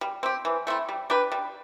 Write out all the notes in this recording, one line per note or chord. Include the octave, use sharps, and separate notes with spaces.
G3
C4 G4
E3
A3 C4 E4
G3
D4 G4 B4
G3